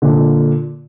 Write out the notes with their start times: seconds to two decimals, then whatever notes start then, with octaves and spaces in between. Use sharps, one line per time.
0.02 A#2 D3